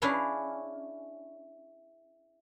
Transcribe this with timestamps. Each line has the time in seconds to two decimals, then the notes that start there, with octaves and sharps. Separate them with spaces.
0.02 C#4 D4 E4 G#4 F5